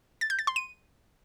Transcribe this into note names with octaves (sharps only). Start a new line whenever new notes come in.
A6
G6
A6
C6
D#7